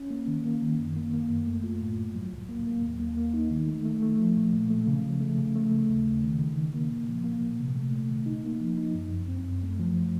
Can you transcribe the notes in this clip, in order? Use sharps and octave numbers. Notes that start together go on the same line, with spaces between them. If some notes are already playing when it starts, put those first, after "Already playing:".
Already playing: C#4
A#3
D#3
A#3
D#3
F#2
A#3
A#3
F#2
A3
F4
A2
A2
F#3
C#2
A#3
A#3
D#2
A#3
A#3
D#4
D#3
A3
A3
A3
F3
A#2
A#2
A3
C#3
F3
A3
C#3
A3
A3
D#2
C#3
D#3
D#3
D#3
A#3
A#2
F3
A#3
A#2
C3
A3
A3
D#3
D#4
A#3
F3
D#4
F#2
F#2
C4
F#2
A3
F3